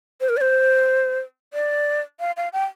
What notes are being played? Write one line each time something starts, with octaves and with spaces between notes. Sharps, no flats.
C5
A#4
D5
C5
D5
F5
F5
G5